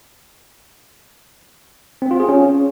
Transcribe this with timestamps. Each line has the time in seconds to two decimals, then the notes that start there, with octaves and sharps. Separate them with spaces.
2.02 C4
2.11 F4
2.20 G#4
2.29 C#4